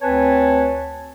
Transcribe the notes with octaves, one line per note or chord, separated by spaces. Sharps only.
D2 C4 B4 C#5 G#5 A5